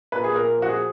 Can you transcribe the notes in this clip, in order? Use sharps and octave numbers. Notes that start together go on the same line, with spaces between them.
A#2 B4
G#4
A#2 A#4
F3 F#4
G#4